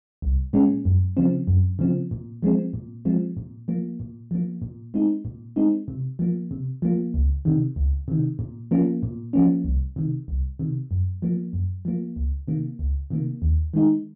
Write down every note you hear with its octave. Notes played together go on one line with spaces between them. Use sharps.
C2
A#2 G#3 C#4
F#2
C#3 F3 C4
F#2
C#3 F3 C4
A#2
F3 G#3 C4
A#2
F3 G#3 C4
A#2
F3 A#3
A#2
F3 A#3
A#2
G#3 C4 D#4
A#2
G#3 C4 D#4
C3
F3 A#3
C3
F3 A#3
C#2
C3 D#3
C#2
C3 D#3
A#2
F3 A#3 C#4
A#2
F3 A#3 C#4
C2
C3 D#3
C2
C3 D#3
F#2
F3 A#3
F#2
F3 A#3
C#2
C3 D#3 A#3
C#2
C3 D#3 A#3
D#2
D#3 G#3 D#4